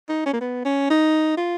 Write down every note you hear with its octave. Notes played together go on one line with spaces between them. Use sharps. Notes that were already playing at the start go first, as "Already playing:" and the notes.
D#4
C#4
A#3
B3
C#4
D#4
F4